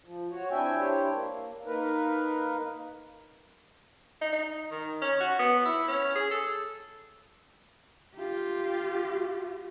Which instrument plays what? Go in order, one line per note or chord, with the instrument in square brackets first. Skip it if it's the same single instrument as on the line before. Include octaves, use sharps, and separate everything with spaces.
[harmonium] F3
F#4 C#5
C4 D4 E4 E5 G5 G#5
D4 E4 G4 C5 C#5
A#3
A#3 D#4 A#4 B4
[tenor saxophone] D#4
D#4
D#3
C#4
F#4
B3
E4
C#4
G#4
A4
[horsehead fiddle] F4 G4